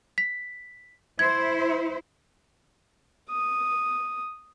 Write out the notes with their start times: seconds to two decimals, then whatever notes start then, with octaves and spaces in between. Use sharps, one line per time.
0.18 B6
1.19 E4 C5 G#6
3.31 D#6